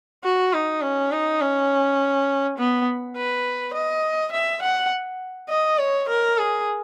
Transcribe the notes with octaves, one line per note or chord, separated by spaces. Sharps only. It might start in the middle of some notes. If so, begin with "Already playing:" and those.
F#4
D#4
C#4
D#4
C#4
B3
B4
D#5
E5
F#5
D#5
C#5
A#4
G#4